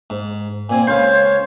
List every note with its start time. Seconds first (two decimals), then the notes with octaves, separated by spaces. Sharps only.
0.10 G#2
0.70 A#2 C4 G#5
0.87 C#2 C5 C#5 F5